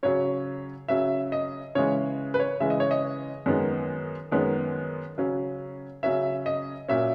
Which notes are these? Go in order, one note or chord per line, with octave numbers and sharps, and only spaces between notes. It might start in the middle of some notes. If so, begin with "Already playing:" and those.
C#3 F#3 C#4 C#5
C#3 F#3 C#4 E5
D#5
C#3 E3 G#3 C#5
B4
C#5
C#3 E3 G#3 E5
D#5
C#5
D#5
F#2 D#3 G#3 B3
F#2 D#3 G#3 B3
C#3 F#3 C#4
C#3 F#3 C#4 E5
D#5
A#2 F#3 C#4 E5